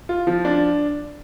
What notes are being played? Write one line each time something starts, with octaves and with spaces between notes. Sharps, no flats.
F4
F3
D4